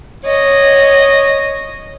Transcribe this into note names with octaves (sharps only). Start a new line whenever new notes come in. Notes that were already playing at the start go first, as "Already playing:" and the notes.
C#5 D#5